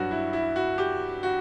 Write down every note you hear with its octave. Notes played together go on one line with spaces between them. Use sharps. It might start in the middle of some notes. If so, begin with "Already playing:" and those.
Already playing: G2 F#3 F#4
E4
E4
F#4
G4
F#4